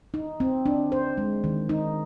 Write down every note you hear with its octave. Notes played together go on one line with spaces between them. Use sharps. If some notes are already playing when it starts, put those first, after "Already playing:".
D#4
C4
D4
C5
G#3
D#3
D#4